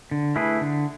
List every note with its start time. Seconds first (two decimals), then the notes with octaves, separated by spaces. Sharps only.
0.11 D3
0.36 A3 E4 G#4 B4
0.61 D3